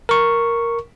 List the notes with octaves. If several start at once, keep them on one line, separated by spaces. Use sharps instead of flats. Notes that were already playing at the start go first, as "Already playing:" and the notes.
A#4 C#6